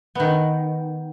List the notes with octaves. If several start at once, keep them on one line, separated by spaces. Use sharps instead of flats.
D#3 B3